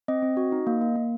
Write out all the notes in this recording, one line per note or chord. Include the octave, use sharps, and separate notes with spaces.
C4 D#5
C4
F#4
D#4
A#3
A#3
A#3